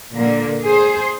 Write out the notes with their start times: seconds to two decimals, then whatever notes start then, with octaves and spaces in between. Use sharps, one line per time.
0.17 A#2 D3 A#3
0.64 G#4 C5